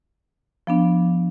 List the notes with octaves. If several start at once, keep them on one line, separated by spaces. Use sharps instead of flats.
F3 B3 D4